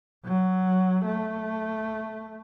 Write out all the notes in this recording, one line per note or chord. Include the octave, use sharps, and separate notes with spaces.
F#3
A3